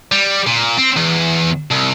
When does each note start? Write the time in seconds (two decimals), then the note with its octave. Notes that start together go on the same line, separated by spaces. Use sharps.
0.12 G3
0.47 A#2
0.78 C4
0.97 E2
1.71 C2